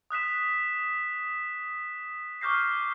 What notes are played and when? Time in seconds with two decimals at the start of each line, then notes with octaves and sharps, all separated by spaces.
0.11 D#6 F#6 B6 E7
2.41 C#6 D6 F6 G6 A#6 C7